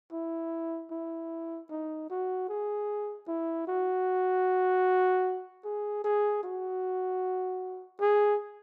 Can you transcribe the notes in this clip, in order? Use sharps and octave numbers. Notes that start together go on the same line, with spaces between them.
E4
E4
D#4
F#4
G#4
E4
F#4
G#4
G#4
F#4
G#4